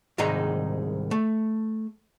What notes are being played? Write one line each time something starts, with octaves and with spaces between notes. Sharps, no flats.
C2 G#2 D#3 G#3 D#4 A#5
A3